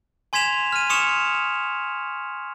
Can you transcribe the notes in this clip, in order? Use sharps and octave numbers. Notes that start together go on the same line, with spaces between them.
G#5 C6 G#6 B6 E7 F7
F6 D#7
C6 C#6 D#6 C#7 E7 F7